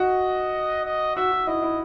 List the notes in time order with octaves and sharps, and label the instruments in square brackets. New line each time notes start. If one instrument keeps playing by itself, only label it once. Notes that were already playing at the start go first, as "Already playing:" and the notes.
Already playing: [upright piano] F#4 [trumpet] D#5
[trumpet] D#5
[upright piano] F#4 [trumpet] E5
[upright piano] F#4
[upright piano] E4 [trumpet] D#5
[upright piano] E4